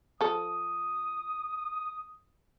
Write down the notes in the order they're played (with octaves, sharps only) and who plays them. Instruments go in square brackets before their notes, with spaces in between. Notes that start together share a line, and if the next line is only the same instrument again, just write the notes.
[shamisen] F3 A4 [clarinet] D#6